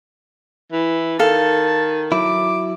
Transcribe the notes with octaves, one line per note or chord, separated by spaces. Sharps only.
E3
D#3 A4 F5 A5
F#3 E4 D6